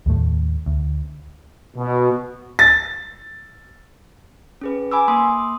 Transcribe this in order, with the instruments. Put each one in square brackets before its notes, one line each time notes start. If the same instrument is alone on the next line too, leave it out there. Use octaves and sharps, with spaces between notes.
[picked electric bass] D#2 A2 A3
D2
[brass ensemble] B2
[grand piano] A6
[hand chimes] C#4 G#4 B4
G#5 B5 D6 E6
A#3 C6 D#6